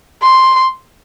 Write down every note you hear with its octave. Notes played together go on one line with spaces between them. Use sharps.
C6